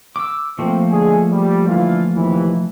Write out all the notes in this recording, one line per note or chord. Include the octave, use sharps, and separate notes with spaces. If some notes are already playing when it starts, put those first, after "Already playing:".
D6 E6
F2 F3 A3 A#3 C4
D3 G#3 G#4
G3
D3 E3 F4
D#2 C3 E3